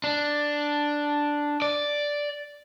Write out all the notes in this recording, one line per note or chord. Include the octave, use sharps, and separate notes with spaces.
D4
D5